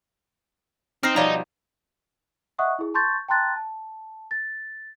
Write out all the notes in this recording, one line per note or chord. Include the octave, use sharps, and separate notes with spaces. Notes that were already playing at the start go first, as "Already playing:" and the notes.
C4 D#4 F6 A#6 C7
B2 F3 G3 D#4 C#5 D5 A#5
D#5 E5 F#5 C#6 D#6 F#6
E4 G#4
A5 C6 C#6 G6 A6
G5 A5 A#5 C6 F#6 A6
A5
A6